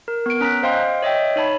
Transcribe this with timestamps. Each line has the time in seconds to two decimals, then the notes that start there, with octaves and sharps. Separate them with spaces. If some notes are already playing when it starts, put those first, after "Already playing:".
0.08 A#4
0.26 B3 D7
0.41 C#4 A#5 F#6 B6
0.63 C5 D#5 F5 G5 C6
1.02 C#5 D#5 E5 G5
1.36 D#4 C#5 A5 B5